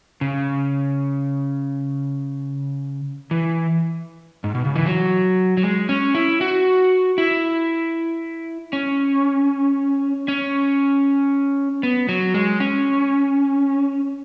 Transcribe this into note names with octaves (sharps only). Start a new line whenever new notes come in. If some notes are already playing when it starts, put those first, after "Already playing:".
C#3
E3
G#2
B2
C#3
E3
F#3
F#3
G#3
C#4
E4
F#4
E4
C#4
C#4
B3
F#3
G#3
C#4